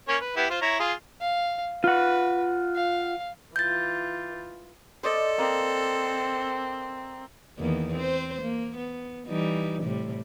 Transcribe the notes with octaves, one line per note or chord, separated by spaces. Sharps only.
A#3 C#4 C#5
B4
B3 E4 G4
F4 C5
E4 C#5 A#5
F4 G#4
F5
F4 B4 F#5
F5
E3 F4 G6 A6
A4 C5 D5 D#5
A#3 C4
E2 D#3 A#3
C4 C5
A#3
B3
E3 G3 D#4
A2 C3 G3